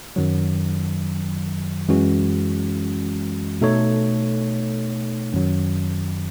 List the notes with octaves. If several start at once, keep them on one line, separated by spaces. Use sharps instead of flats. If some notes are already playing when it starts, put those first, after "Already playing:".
F#2 D#3 F#3
F#2 E3 G#3 C#4 F#4
B2 A3 D#4 A4 C#5
F#2 D#3 F#3